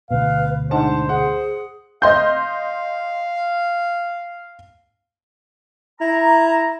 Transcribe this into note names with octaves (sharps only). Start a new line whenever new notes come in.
D2 B2 B4 F5
G#2 D4 C5 F#5 A5
G#4 F#5
D#5 F5 C6 G6
E4 A#5